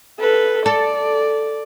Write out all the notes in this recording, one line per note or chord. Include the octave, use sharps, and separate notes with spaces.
A4 B4
A4 D5